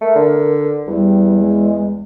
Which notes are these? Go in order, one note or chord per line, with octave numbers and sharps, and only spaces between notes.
A3 A#4
D3
E2 G3
G#3